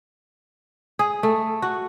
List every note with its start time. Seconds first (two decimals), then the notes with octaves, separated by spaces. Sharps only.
0.99 G#4
1.23 A3
1.62 F#4